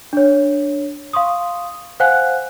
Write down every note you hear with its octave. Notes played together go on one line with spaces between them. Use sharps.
D4 C#5
F5 C6 C#6 D#6
C5 F5 F#5 G#5 F#6